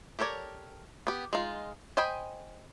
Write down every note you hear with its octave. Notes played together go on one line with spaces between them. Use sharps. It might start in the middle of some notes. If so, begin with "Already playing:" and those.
G4 A4 A#4 C#5 D5
B3 G4
G#3 D#4 F4
C5 D#5 G5 G#5 B5